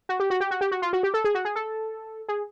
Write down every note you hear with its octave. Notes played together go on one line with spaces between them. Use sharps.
F#4
G4
F#4
G4
F#4
G4
F#4
F4
F#4
G4
A4
G#4
F#4
G#4
A4
G#4